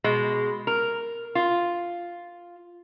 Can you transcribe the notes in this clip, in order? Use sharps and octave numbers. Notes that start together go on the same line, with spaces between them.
B2 G#3
A#4
F4